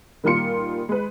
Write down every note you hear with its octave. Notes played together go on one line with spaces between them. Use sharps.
A#2 D#3 G3 F4 C6 C#7
G#3 B4